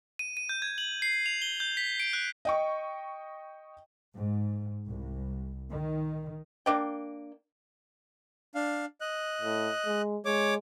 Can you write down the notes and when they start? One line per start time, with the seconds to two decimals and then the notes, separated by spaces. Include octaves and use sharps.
0.19 D#7
0.37 D#7
0.49 G6
0.62 G#6
0.78 F#7
1.02 C7
1.26 F7
1.42 G7
1.60 G6
1.77 B6
2.00 D7
2.13 F#6
2.45 D#5 G5 C#6
4.16 G#2
4.89 C2
5.71 D#3
6.66 A#3 D4 G5
8.55 D4 F5
9.01 D#5 F#6
9.42 A2
9.86 G#3
10.25 G#3 C#5 D6